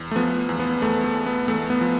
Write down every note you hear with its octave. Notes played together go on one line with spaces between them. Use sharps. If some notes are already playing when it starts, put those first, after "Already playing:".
Already playing: E2
A3
F3 B3
E2
B3
E2 A3
A3
E2
B3
E2 A3
B3
F3